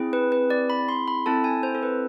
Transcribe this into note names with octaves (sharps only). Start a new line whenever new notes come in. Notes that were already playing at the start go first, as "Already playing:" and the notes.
Already playing: C4 E4 G#4
B4
B4
D5
B5
C6
B5
C4 E4 A4 A5
G#5
C5
A4
B4